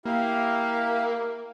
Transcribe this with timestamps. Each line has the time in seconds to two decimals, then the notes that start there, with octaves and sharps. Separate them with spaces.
0.05 A#3 E4 G4 F5